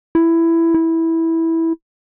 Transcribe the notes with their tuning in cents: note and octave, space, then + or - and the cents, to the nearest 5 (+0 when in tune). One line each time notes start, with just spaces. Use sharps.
E4 +10
E4 -10